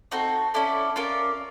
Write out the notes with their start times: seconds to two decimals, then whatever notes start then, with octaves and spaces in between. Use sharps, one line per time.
0.11 C4 D#4 F#4 A4
0.54 C#4 E4 A4 D5
0.96 C#4 F4 A#4 D5